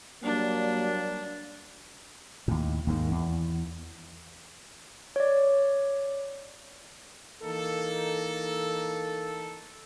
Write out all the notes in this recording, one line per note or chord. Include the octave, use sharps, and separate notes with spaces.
F#3 G3 A#3 D4
D#2 A2
D#2 G#2 D#3
E2
C#5 D5
E3 A#3 D#4 A4